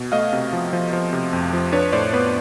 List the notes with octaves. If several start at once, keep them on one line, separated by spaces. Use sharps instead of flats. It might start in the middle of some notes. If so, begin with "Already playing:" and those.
Already playing: B2
A3 D#5 F5
C3
F3
F3
F3
C3
F2
F3
D4 B4 C#5
A2 C5 D5
B3 B4 C#5